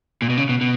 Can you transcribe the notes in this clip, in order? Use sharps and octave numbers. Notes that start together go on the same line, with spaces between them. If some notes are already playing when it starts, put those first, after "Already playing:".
A#2
B2
C#3
B2
B2